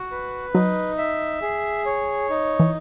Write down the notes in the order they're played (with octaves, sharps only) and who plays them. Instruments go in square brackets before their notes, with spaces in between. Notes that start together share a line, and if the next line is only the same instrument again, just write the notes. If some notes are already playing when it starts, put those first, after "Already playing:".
Already playing: [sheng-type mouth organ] F#4
B4
[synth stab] F#3 [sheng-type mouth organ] D#4
[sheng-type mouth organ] E5
G#4
C#5
D#4
[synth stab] E3